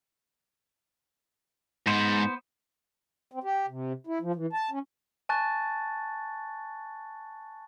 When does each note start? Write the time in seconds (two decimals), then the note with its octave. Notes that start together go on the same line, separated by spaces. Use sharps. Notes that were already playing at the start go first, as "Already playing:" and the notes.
1.87 G#2 B3 C5
3.32 C4
3.44 G4
3.68 C3
4.07 E4
4.21 F3
4.35 E3
4.53 A5
4.71 C#4
5.29 G#5 A5 C#6 F#6 A6